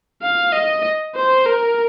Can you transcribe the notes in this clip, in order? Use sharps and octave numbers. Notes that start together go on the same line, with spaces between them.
F5
D#5
C5
A#4